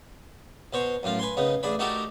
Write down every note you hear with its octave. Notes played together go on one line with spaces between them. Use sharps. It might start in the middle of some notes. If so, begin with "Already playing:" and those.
B2 C5 C#5
F#2 A2 F4 F5
B4 G#5 C6
C#3 B3 D#4
A1 D4 G#4 B5
A3 D#4 F#4 G4 A4 A#4